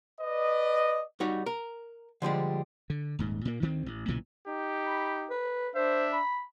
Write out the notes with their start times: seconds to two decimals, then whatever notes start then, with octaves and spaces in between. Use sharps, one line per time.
0.21 B4 D5 D#5
1.20 G3 D#4 F#4 C#5
1.46 A#4
2.22 D3 F3 G3 G#3
2.90 D3
3.19 D#1 G#2
3.45 A#2 A#3
3.62 D2 D#3 C4
3.86 A1
4.08 B1 A#2 C#3 E3
4.47 D#4 G4
4.86 B5
5.30 B4
5.75 D4 C5 E5
6.13 B5